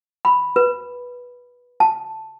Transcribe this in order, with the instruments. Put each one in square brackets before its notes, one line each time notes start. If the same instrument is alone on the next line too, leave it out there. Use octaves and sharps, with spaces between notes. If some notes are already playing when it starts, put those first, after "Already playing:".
[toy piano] B5
B4
A5